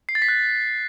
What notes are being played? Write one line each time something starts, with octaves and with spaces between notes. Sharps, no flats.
C7
A6
B6
F#6